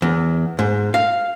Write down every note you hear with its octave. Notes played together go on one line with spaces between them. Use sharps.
E2
G#2
F5